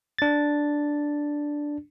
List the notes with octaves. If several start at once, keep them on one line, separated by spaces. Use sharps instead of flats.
D4 A6